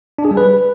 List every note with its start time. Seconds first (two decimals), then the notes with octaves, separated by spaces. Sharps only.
0.18 D4
0.25 G#4
0.31 G3
0.37 B4